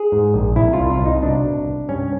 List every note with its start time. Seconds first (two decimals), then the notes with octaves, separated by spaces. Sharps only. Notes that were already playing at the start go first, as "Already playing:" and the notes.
Already playing: G#4
0.12 G#2
0.34 A#1
0.56 C2 E4
0.73 F4
0.79 C2
0.90 F4
1.01 C2 D#4
1.22 B2 D4
1.45 C2
1.67 C2
1.89 G2 C#4